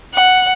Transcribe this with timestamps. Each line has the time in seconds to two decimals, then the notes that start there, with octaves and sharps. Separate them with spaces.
0.14 F#5